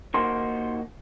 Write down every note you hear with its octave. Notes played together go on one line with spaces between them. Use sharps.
D#3 A#3 D#4 F#4 C5 C6